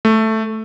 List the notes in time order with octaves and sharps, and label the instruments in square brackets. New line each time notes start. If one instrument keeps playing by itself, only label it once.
[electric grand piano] A3